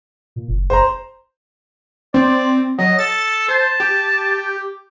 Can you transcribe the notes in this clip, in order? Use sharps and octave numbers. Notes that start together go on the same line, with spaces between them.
A#2
F#1
F#1 C5 A#5
C4 D5
F#3 D#5
A4 A6
C5 A5
G4